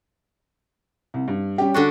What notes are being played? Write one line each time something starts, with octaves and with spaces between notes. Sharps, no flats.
C2
G2
G3 C#4 G4
D3 D4 F#4